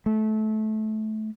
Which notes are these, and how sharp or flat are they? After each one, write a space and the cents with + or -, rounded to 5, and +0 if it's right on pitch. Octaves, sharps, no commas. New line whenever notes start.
A3 -20